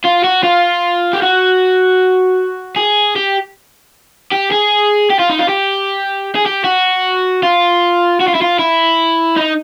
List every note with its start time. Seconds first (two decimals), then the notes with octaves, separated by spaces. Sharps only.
0.05 F4
0.24 F#4
0.44 F4
1.13 G4
1.22 F#4
2.76 G#4
3.16 G4
4.32 G4
4.51 G#4
5.10 G4
5.19 F4
5.30 D#4
5.39 F4
5.49 G4
6.35 G#4
6.46 G4
6.64 F#4
7.43 F4
8.20 F#4
8.28 F4
8.35 E4
8.42 F4
8.59 E4
9.36 D#4